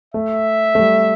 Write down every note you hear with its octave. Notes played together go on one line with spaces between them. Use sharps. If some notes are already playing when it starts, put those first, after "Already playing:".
A3 E5
A3
G3